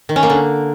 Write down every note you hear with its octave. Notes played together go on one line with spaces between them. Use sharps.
D#3
C#4
A#3
D3